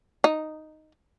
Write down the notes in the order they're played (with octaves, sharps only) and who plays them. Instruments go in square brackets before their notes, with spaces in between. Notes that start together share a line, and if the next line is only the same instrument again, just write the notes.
[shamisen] D#4